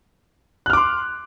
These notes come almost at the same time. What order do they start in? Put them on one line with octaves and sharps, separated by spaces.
F#6 F6 D6 C6